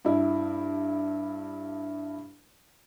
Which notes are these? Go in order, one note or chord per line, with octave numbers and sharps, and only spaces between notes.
G2 E4